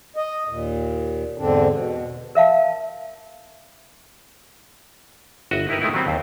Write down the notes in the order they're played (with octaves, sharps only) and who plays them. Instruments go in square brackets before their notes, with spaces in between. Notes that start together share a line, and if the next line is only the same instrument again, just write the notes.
[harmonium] D#5
D#2 A#2
E2 G#2 D3 C4 D4
B2
[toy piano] A#4 E5 F5 A5
[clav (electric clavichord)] G1 F#4 D#5 E5
D#4 E4 G4 A#4 B4
G#3 A3 B3 D#4 E4 G4
D#3 F#3 G3 C4 F#4
D#2 C5